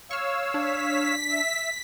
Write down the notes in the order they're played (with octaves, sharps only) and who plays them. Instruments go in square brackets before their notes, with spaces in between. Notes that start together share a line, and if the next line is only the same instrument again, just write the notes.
[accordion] C#5 F5 E6 [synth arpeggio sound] C#6 F6
[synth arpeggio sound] D4 [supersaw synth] B6
[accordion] E5